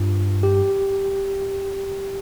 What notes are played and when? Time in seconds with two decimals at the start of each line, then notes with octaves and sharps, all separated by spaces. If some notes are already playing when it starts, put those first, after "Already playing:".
Already playing: G2 F4
0.43 G4